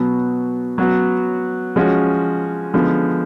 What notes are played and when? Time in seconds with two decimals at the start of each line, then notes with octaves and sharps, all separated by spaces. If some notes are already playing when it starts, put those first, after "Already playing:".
Already playing: B2 F#3 B3
0.78 F#3 B3 F#4
1.76 F3 G#3 C#4 F#4
2.73 D3 F3 G#3 B3